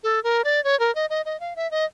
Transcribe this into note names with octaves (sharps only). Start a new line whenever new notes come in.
A4
A#4
D5
C#5
A#4
D#5
D#5
D#5
F5
E5
D#5